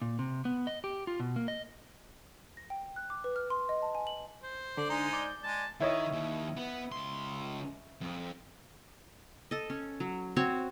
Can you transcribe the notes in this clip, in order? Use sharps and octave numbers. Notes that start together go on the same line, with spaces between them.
A#2
C3
B3
D#5
G4
F4
B2
A#3
D#5
A#6
G5
F#6
D6
B4
F6
C6
D#5
A5
G#5
F#7
C5
D3 D5
G#3 D#4
D5 G6
G#3 A5
D#3 E4 C#5 D#5
D#2
B3
C#2 C6
F2
A4 D#5
C#4
F#3
C4 F#4 C#5